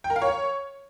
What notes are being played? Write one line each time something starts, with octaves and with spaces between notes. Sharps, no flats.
G5
A#4
F5
C#5